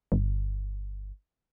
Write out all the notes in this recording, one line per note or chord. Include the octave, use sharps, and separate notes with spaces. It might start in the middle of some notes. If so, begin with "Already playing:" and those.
G1